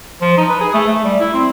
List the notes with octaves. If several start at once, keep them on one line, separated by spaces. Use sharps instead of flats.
F3
D#4
B4
G#4
A3
A3
G3
E4
C4